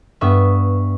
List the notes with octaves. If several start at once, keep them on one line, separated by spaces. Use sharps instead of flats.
G2 B3 E5 C#6